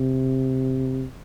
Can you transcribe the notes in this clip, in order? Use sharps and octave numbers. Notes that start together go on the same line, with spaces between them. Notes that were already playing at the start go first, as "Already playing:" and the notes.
Already playing: C3